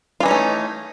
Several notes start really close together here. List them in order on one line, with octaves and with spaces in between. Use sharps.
F4 E3 D#4 C#4 A3